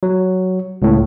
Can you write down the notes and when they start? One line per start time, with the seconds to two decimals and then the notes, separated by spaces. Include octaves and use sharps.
0.03 F#3
0.82 C#2 A2